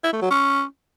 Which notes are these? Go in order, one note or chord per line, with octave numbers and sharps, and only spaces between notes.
E4
A3
F#3
C#4